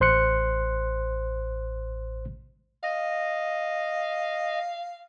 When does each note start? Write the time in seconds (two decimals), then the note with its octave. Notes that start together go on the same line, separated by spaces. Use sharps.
0.01 A1 C5 C6 F#6 C#7
2.83 D#5 F5